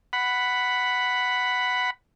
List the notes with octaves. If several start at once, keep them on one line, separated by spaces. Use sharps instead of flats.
F#5 B5